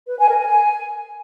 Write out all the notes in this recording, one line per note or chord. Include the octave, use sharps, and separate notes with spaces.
B4
G#5
A#4
G#5
G#5